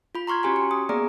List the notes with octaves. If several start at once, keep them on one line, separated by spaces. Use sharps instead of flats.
F4 B5
A#5 C6 C#6 F6 G#6
C#4 F#4 G4 G#5 C6
C#7
D#6
A#3 B3 G#4 D5 A#5